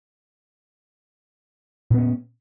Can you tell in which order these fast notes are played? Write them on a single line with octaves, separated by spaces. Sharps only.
A#2 B3 C#4